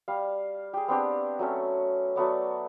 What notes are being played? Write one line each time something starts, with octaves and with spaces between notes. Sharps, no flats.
G3 F5
G4 G#4
B3 C4 D4 G4
F#3 A3 C#4
F#3 A3 B3 D5